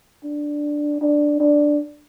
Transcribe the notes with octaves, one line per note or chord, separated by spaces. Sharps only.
D4
D4
D4